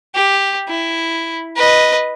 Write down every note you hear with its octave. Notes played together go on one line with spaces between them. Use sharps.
G4
E4
B4 D#5